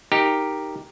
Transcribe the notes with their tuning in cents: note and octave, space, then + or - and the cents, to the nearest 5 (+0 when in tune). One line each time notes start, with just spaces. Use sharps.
D#4 +0 G4 +5 A#4 +0